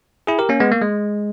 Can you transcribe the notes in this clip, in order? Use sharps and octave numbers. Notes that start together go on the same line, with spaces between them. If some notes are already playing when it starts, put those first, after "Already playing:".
E4 G#4
G4 A#4
A#3 C#4
G#3 B3
A#3
G#3